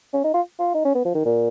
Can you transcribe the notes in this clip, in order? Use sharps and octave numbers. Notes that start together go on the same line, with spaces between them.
C#4
D#4
F4
F4
D#4
C#4
B3
F3
D#3
A#2